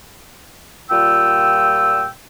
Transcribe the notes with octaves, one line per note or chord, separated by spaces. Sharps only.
A#2 G3 F4 G5 E6